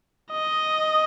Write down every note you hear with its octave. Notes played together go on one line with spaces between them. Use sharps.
D#5